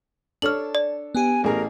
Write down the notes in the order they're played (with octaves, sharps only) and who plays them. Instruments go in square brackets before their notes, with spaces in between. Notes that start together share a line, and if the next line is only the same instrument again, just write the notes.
[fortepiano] D4 A4 C#5 [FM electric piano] A5 [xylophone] F6 F#7
[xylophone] D5
[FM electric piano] B3 G4 [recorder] G#5
[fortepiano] A1 G#4 [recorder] A#4